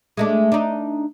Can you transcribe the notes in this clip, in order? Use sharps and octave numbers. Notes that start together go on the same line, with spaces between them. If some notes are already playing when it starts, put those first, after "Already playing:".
G#3 A3 D4
D4 D#4